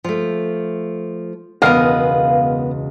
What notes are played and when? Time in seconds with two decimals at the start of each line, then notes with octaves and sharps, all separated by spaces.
0.04 F3 A3
1.62 E1 C#2 B3 A#4 D#5 F5